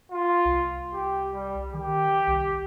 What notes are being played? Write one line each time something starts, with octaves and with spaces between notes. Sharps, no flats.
F4
C2
G4
G3
D#3 G4
C2